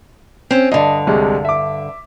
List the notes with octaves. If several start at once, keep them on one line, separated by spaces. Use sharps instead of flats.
C4 C#4
G2 D3 D#5 A5
C2 C3 G#3
E5 D6